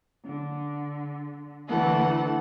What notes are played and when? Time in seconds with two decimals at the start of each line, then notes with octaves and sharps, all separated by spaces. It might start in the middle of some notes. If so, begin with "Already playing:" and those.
0.25 D3
1.68 D2 D3 E3 A3 A4 F#5